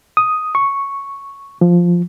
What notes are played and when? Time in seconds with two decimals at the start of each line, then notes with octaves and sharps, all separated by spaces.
0.17 D#6
0.55 C#6
1.61 F3